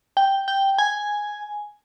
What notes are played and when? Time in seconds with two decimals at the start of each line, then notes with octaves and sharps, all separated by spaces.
0.17 G5
0.48 G5
0.78 G#5